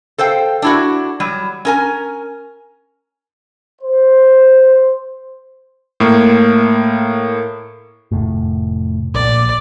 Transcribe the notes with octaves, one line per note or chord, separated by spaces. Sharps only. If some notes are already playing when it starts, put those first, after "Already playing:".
A4 C5 F5 G5
D4 E4 F#4
F#3 G3
C#4 A#4 G#5
C5
A2 A#3
F1 A2
A#1 D5